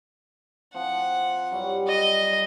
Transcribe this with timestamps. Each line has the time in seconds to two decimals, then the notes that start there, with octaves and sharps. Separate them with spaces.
0.74 F3 C4 F#5
1.51 G2 F#3 G3
1.88 D#5